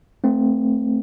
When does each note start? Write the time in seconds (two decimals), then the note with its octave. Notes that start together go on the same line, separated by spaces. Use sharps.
0.24 A3 C4